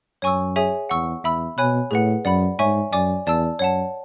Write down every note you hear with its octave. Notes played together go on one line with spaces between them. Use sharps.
F#2 C#5 G#5 C#6 E6
G#4 C#5 E5 G#5
E2 F#5 C#6 E6
E2 E5 B5 E6
B2 C#5 G#5 B5 F#6
A2 G#4 B4 F#5
F#2 D5 F#5 B5
G#2 C#5 E5 G#5 C#6
F#2 D5 G#5 D6
E2 D5 A5 E6
F#2 C#5 F#5 A5